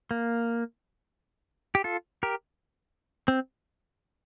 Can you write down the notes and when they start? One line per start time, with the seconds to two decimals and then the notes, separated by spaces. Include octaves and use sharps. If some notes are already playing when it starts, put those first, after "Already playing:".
0.11 A#3
1.75 G4
1.84 F4 A4
2.23 G4 A#4
3.28 C4